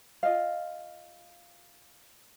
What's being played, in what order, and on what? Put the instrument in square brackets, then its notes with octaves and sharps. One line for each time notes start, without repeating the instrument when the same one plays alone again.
[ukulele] F4 D#5 F5